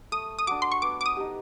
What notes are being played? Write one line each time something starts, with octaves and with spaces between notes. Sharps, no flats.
A3 D#6
D#6
D4 F#4 D6
C6
C#6
B3 D6
D6
D#6
D#4 G4